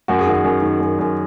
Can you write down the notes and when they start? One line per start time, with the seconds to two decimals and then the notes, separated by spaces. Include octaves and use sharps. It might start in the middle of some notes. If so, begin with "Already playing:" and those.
0.08 F#2 F#4
0.19 G#4
0.27 D#3 F#4
0.44 F#2
0.62 D#3
0.80 F#2
0.99 F#2